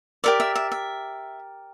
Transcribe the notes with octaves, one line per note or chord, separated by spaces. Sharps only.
G4 A#4 D5 E5
E5
E5
E5